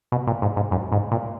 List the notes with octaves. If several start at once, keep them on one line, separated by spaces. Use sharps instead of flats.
B2
A#2
G#2
G#2
F#2
G#2
A#2